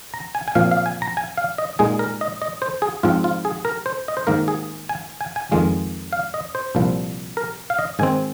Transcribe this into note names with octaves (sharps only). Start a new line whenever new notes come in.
A#5
G#5
G#5
A#2 F3 C4 F5
F5
G#5
A#5
G#5
F5
D#5
A#2 G#3 D#4 G#4
A#4
D#5
D#5
C5
G#4
G#2 F3 C4 F4
F4
G#4
A#4
C5
D#5
C5
G#2 D#3 A#3 A#4
G#4
G#5
G#5
G#5
F2 D#3 G#3 F4
F5
D#5
C5
C2 A#2 F3
A#4
F5
D#5
G#2 D#3 C4 G#5